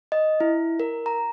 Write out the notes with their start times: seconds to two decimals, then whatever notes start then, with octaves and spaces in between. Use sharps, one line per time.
0.12 D#5
0.40 E4
0.80 A#4
1.06 A#5